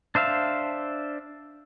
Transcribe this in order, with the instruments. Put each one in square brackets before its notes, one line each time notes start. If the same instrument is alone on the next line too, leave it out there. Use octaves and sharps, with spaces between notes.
[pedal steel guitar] D4 C5 E5 F5